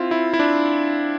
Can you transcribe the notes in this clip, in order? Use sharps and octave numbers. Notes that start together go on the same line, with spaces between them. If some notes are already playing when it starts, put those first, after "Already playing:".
Already playing: C4 E4 F4
E4
E4
D4